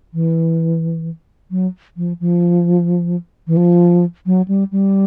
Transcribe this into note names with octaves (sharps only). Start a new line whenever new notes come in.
E3
F#3
F3
F3
E3
F3
F#3
G3
G3